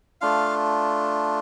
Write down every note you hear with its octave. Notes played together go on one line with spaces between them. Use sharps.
A3 D4 F4 F5